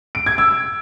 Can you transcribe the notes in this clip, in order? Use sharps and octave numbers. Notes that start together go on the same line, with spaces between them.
D7
G#6
E6